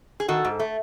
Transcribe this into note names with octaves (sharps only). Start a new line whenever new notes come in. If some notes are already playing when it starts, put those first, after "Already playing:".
G#4
D#3 F#4 A4
G#2
A3